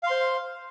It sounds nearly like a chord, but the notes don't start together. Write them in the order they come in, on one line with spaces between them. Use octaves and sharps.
F5 C6 C5